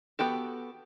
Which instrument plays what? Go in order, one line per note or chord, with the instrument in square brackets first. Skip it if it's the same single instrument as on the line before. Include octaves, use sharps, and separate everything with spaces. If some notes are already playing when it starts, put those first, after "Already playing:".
[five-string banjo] B3 F#4 G4 A4